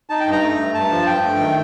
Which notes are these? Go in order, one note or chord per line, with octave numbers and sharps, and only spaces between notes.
D#4 A5
G5
G2
A#5
A3
G2
G2 A5
F3
G2 G5
A3
D#3